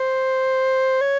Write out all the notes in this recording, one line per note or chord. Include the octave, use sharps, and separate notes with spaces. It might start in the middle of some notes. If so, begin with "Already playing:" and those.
Already playing: C5
C#5